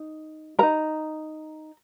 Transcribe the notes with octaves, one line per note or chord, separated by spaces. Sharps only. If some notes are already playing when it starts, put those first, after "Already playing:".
Already playing: D#4
D#4 A#4 A#5